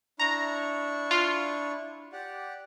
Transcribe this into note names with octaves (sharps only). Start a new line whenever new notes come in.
D4 E4 A#5 C#6
F4
G4 D5 F#5